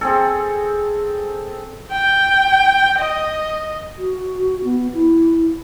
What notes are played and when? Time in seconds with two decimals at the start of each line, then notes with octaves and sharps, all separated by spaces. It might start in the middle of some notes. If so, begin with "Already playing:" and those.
0.01 C4 G#4 A4
1.91 G5
2.99 D#5
3.98 F#4
4.64 B3
4.94 E4